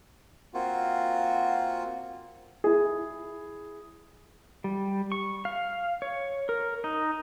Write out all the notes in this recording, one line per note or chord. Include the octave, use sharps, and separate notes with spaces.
A#3 C4 F4 F#4
E4 G#4
G3
C#6
F5
C#5
A#4
D#4